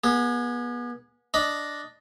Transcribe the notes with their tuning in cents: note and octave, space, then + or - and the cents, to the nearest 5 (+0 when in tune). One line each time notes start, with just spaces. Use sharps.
B3 -30 G#4 +0
D4 +0 D#5 +0 B5 +0